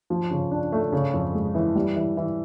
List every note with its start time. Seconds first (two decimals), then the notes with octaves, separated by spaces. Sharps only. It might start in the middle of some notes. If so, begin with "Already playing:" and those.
0.10 F3
0.31 C#3
0.51 D4
0.72 A3
0.92 C#3
1.13 F2
1.34 G#3
1.55 E3
1.75 G3
1.96 E3
2.17 E3